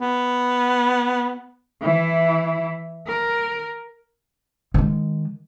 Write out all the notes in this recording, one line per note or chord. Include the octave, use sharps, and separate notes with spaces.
B3
E3 E4
A#4
D#3 G#3